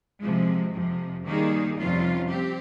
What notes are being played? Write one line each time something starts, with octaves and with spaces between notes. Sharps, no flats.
C3 F3 G#3
F2 C3 F3
D#3 G3 A#3 D#4 G#4
F2 C3 G3 C#4 F4
C4 G4